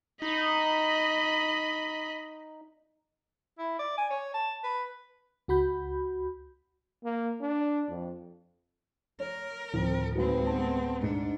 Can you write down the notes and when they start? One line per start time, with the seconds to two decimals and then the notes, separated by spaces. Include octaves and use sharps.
0.22 D#4 D#5 B5
3.58 E4
3.79 D5
3.98 G#5
4.11 C#5
4.34 A5
4.64 B4
5.48 C#2 F#4 B5 G6
7.04 A#3
7.41 D4
7.90 F2
9.20 A#4 C#5
9.74 D2 A2 D#3 F3 C4
10.15 D#2 F#3 G#3 C4 B4
10.47 B3 A5
11.02 G#2 D4 C#7